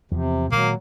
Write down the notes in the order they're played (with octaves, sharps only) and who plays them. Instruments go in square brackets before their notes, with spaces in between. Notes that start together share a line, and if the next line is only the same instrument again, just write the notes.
[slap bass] E2 F3 [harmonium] C3
[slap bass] A#2 D#3 G#3 [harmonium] F#3 [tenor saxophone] A#3